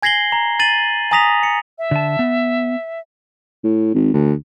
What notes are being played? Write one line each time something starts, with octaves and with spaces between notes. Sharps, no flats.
G#5 G#6 A#6 C7 F#7 G7
A#5
A6 D#7 F#7
G#5 A#5 D#6 A#6 B6 F7
C#7
E5
D3 A5
B3
A2
G#1
D2